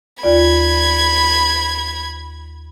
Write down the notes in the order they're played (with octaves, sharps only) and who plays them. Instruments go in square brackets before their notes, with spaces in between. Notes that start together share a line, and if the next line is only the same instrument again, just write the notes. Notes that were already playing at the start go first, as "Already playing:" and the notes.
[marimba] D#2 F4 D5 [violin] B5 G#6